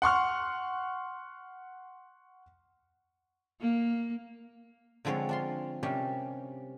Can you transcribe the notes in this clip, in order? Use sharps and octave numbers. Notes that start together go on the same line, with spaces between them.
F#5 C6 C#6 F6
A#3
D3 F3 G#3 C4 C#5
D4 F4 C6
C3 G3 C#4 D4 G4 A#4